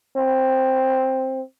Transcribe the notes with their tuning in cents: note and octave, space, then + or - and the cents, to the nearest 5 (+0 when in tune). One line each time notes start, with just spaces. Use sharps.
C4 +5